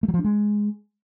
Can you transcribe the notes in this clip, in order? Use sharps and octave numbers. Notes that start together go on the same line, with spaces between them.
A3
F#3
F3
D4
G#3